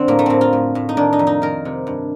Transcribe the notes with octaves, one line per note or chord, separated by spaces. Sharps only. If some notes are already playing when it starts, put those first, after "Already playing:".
Already playing: F2 D3 C4
A2 A#3
A3
A2 A#3 C4
F4
A2
A2
D#4
D#3 D4
D#4
F2
D#4
D#3 A#4
C3
G2